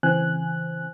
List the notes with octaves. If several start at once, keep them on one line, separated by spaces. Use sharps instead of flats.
C#3 E3 C4 G#5 F#6